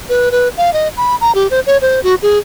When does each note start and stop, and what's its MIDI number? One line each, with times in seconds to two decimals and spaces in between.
0.09 0.29 71
0.31 0.49 71
0.57 0.71 77
0.73 0.88 75
0.97 1.16 83
1.21 1.32 82
1.35 1.47 67
1.51 1.60 72
1.66 1.77 73
1.81 2.03 72
2.04 2.15 66
2.23 2.39 68